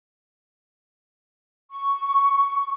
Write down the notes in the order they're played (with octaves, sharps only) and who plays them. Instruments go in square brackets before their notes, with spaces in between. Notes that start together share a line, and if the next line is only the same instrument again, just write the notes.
[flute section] C#6